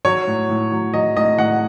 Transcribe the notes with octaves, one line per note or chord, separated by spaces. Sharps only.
F#3 C#5
A2
A2
F#3
F#3 D#5
A2 D#5
A2 F#5